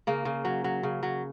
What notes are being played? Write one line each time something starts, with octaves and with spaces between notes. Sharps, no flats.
C#3 A#3
C#3
F#3
F#3
C#3
F#3